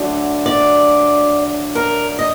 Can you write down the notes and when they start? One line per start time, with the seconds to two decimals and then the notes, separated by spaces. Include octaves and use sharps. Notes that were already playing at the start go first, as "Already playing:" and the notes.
Already playing: D2 D3 F#3
0.46 D5
1.75 A#4
2.19 D#5